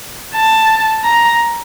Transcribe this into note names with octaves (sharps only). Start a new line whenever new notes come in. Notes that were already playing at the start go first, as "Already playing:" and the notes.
A5
A#5